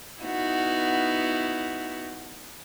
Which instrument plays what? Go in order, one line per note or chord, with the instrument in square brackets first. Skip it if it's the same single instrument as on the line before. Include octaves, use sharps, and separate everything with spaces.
[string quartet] B3 D#4 E4 F#4